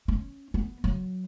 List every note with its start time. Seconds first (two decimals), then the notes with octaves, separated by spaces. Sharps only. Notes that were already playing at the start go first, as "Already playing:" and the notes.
0.08 C#4
0.54 B3
0.84 F#3